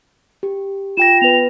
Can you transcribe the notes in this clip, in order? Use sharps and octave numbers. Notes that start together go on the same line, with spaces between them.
G4
F4 G5 A#6 E7
B3 B4 F7